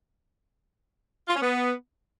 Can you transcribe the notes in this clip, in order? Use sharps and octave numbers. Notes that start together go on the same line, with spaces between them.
F4
C#4
B3